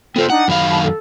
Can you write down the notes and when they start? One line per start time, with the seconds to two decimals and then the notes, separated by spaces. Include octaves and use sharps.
0.16 B3 F4 A4 C5 G5
0.30 D4 D#4 F#5
0.48 F#2 D#3 F5 B5
0.70 A5 B5
0.82 A4